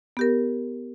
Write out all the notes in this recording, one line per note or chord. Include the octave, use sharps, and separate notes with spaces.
B3 G4 A#4